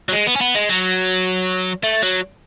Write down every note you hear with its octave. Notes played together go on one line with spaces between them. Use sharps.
F#3
G#3
B3
C#4
B3
G#3
F#3
A3
F#3